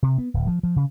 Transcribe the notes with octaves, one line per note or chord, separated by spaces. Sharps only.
C3
B3
D1
F3
F3
C#3